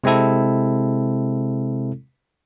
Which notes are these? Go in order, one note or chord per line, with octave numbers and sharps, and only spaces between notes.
C3 G#3 C4 E4 A4